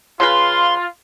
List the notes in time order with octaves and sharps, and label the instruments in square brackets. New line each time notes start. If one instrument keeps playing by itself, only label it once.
[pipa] C#3 G#3 B4 [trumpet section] F4 [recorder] C6